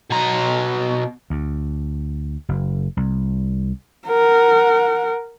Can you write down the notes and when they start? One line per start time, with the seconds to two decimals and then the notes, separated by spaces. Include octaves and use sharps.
0.11 B2 A#5
1.30 D2
2.49 F#1
2.97 C2
4.07 A#4 F#5